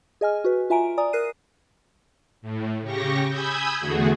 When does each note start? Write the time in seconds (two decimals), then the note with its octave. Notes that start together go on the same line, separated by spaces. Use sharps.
0.21 G#4 D#5 G#5 F6
0.44 F#4 B4
0.70 F4 E5 G#5 A#5 D7
0.97 D5 G#5 A#5 D#6
1.13 A#4 F#6 C7 D#7
2.42 A2
2.82 C#3 G4 C#6 A#6
3.29 G#5 B5 D#6 E6 G6 G#6
3.80 E2 D3 A3 F#4 G#4